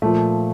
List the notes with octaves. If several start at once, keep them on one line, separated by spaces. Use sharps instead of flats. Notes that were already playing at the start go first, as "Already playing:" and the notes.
A#2 F3 A3